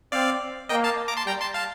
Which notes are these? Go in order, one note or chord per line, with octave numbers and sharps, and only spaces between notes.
C4 D5 F5
A#3 D#5 G5
F5 A5
A#5 D6
A5 C6
G3 G5 A#5
A5 C6
F5 A5